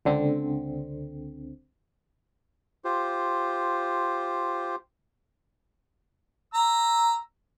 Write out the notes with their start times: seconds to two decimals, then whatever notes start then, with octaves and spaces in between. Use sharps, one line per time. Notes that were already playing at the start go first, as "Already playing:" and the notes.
0.05 C#2 D3 C4
2.85 F4 G4 C5
6.54 A#5 E6